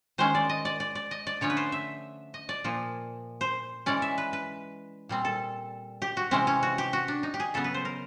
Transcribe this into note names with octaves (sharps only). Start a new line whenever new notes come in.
D#3 G#3 C#4 C5
D5
D#5
D5
D5
D5
D#5
D5
D3 F3 A3 C#4 C#5
B4
C5
E5
D#5
D5
A#2 F3 A#3
C5
E3 G#3 C#4 D5
E5
B4
B4
A#2 G3 C4
A4
G4
F#4
C3 E3 G#3 C4 C#4
C#4
F#4
G4
F#4
D4
D#4
G4
G#4
C#3 F#3 B3 A4
B4
C5
A#4